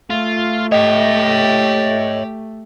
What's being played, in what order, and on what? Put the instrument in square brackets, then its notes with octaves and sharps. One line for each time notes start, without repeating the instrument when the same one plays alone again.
[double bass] A3 [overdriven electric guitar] F4
[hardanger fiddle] G4 [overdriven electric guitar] C#5 E5 [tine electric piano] D#5